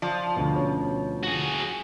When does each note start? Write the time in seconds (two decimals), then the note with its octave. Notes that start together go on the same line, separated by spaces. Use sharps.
0.02 F3 D5
0.37 D2 B2
0.56 C#4 C#5
1.23 F#4 G#4